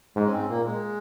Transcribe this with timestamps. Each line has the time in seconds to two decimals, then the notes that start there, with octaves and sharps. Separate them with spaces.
0.16 G#2 G#3
0.26 C#4
0.33 C4
0.49 A#2 A#3
0.66 G#3